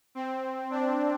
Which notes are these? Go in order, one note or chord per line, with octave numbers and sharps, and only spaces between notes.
C4
D4